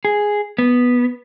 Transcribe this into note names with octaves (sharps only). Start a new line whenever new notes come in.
G#4
B3